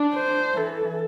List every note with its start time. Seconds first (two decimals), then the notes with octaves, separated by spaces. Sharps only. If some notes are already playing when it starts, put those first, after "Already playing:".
Already playing: D4
0.15 C5
0.56 E3 A4